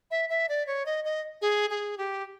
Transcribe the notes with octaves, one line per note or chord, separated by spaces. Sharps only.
E5
E5
D5
C#5
D#5
D#5
G#4
G#4
G4